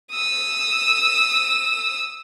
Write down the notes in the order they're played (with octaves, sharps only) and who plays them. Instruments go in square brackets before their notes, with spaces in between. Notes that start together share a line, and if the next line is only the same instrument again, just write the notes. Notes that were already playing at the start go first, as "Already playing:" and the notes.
[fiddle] D#6 E6